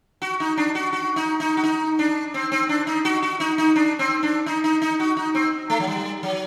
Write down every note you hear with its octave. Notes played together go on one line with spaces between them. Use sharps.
F#4
D#4
D4
F#4
F#4
D#4
D#4
F#4
D#4
D4
C4
C4
D4
D#4
F#4
F#4
D#4
D#4
D4
C4
D4
D#4
D#4
D#4
F#4
D#4
C4
A3
F#3
G3
F#3